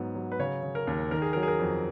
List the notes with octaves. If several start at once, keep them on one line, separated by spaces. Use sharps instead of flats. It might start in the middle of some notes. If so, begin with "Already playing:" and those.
Already playing: G#2 F#3 B3
F#3
B4
C#3 C#5
C#3
A#4
D#2
D#3 A#4
G#4
A#4
F#3
G#4
A#4
F2